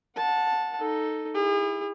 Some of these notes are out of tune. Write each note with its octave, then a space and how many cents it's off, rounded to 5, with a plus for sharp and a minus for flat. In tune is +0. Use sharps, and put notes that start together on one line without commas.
F#5 -25 A5 +0
D#4 +0 A4 +0
E4 +0 G#4 -40